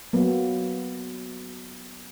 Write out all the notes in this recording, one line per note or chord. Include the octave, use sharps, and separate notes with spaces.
F#3 A#3 B3